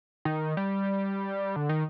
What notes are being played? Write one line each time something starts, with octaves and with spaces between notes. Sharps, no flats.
D#3
G3
D3
D#3